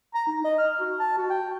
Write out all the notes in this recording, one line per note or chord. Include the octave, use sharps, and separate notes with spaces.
A#5
D#4
D#5
F6
F#4
A5
F#4
G5